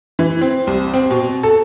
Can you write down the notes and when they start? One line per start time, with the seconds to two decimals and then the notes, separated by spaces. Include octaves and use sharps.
0.19 E3
0.41 C4
0.67 C2
0.94 C4
1.11 B2
1.43 A4